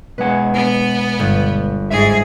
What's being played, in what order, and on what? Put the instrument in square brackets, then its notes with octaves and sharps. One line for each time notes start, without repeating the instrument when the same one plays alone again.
[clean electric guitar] B2 G#3 F#5 [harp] B4 G#5
[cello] B3
[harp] G1
[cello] G#2 G#4 [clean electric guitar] E5